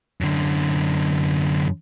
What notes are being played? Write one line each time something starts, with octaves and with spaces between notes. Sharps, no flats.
F#2 D3